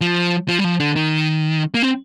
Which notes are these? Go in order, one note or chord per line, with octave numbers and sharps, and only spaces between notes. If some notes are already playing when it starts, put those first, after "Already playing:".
F3
F3
G3
F3
D3
D#3
A#3
C4